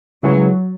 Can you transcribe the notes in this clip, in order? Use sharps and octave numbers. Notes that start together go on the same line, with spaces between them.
C#3 F#3 G#3 E4 G#4 B4